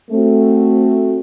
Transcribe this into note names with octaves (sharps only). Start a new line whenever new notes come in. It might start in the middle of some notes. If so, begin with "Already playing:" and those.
A3 C4 F#4